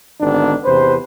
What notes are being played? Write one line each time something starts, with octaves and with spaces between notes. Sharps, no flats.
G#1 D3 D#3 B3 D4
E2 C3 B4 C5